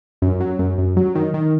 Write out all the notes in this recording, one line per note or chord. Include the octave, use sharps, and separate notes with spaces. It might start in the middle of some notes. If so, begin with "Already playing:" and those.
F#2
F#3
F#2
F#2
F#3
D#3
D#3